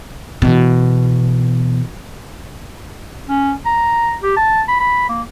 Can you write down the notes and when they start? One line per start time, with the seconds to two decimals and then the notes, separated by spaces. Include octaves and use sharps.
0.42 B2 E3
3.29 C#4
3.66 A#5
4.23 G4
4.37 A5
4.68 B5
4.80 B5
5.09 A#3